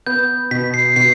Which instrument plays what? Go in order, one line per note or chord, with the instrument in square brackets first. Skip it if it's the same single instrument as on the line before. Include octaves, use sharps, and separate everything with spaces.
[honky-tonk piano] B3 [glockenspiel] G6
[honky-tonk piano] B2 [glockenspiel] B6
[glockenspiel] C7
[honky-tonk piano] B2 [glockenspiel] C7